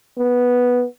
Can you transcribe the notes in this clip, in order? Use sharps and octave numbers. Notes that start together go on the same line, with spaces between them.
B3